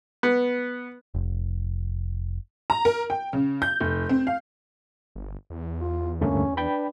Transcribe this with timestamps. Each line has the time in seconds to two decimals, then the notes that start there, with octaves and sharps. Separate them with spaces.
0.23 B3
1.15 F1
2.70 A#5
2.85 A#4
3.10 G5
3.33 C#3
3.62 G6
3.80 F1
4.09 C4
4.27 F5
5.16 G1
5.50 E2
5.81 F4
6.21 D2 G2 A3 A#3 C#4
6.57 D4 B4 G5 B5